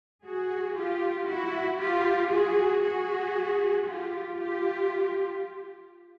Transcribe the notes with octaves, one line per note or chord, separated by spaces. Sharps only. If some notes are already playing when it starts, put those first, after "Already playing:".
F#4 G#4
F4 G4
E4 F#4
F4 G4
F#4 G#4
F#4 G#4
F4 G4
F4 G4